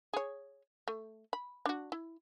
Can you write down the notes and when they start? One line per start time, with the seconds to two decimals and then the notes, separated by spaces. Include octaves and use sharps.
0.13 G#4 C#5
0.88 A3
1.33 B5
1.66 D4 F#4
1.92 E4